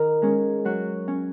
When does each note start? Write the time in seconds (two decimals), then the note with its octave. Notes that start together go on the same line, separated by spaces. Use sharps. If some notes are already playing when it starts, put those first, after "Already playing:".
Already playing: D#3 A#4
0.22 G#3 C#4
0.65 F#3 F#4
1.08 C#4